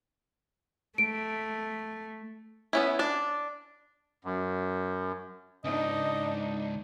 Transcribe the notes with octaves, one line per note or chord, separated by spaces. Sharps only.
A3 D7
B3 C#4 E4
D4 D5
F#2
C#2 G#2 D4 D#4 D#5